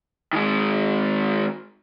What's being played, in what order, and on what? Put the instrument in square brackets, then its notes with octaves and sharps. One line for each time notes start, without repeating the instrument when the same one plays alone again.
[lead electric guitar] D#3 G#3